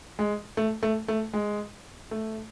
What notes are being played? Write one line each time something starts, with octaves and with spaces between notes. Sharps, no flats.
G#3
A3
A3
A3
G#3
A3